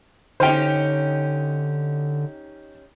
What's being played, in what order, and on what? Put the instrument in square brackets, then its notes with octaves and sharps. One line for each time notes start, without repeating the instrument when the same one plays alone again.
[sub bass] D3 [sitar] C#4 D#4 G4 [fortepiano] C5 G5